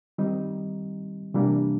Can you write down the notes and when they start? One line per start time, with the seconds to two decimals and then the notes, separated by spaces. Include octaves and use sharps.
0.18 D#3 G3 C4 D#4
1.34 C3 E3 G3 A#3 D4